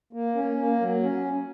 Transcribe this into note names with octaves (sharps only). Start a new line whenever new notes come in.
A#3
C#4
A#3
F#3
C#4